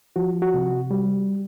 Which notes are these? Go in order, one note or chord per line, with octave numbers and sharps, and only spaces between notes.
F3 F#4
F#4
C3
G3